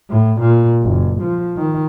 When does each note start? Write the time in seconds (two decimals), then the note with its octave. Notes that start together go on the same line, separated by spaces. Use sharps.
0.10 A2
0.41 A#2
0.83 F#1
1.22 F3
1.56 D#3